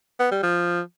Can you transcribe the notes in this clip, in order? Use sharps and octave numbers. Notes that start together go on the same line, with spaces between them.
B3
G3
F3